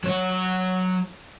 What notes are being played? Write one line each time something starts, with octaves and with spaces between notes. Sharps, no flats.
F#3 C#5